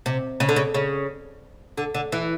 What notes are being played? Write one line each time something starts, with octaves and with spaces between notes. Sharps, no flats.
C3
C#3
D3
C#3
C#3
D3
D3
E3